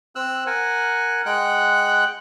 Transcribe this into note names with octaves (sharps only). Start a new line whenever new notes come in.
C4 E6 F#6
A#4 F#5 G#5
G#3 F#5 G5 F#6